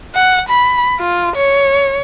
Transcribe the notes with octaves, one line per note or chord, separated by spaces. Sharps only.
F#5
B5
F4
C#5